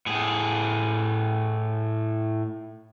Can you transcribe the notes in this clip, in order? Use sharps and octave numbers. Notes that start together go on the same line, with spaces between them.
A2 G#4